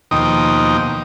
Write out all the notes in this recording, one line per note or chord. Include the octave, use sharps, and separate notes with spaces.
D#2 B2 F3 D#4 G5 D#6